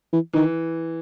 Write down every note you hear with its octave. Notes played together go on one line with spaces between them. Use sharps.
E3
D#3 E3